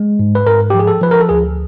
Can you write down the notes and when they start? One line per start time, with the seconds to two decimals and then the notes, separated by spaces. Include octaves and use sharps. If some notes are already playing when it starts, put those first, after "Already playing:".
Already playing: G#3
0.19 G#2
0.35 B4
0.47 G#2 A#4
0.70 G4
0.75 F3 G#4
0.87 A4
1.01 F3 B4
1.11 A#4
1.20 A4
1.29 D2 G#4